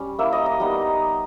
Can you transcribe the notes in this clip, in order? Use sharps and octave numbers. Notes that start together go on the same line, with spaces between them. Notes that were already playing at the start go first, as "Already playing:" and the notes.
Already playing: G3 C#4
A#3 E4 E5
D#5
D#5
G3 B3 D#4